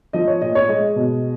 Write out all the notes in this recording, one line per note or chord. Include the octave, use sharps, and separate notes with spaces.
F3 D#5
C#5
A#2 D#5
C#5
G#3 D#5
B2